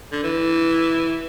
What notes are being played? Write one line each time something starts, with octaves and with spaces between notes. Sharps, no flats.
D3
E3